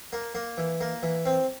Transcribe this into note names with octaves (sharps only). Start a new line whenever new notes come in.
A#3
A#3
E3
A#3
E3
C4